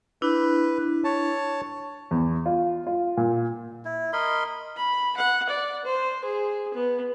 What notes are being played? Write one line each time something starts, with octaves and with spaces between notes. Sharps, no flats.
D4 E4 B4
C#5 A5
E2
F4
F4
A#2
E4
A#4 D#5 B5 C6
B5
F#5
D5
C5
G#4
B3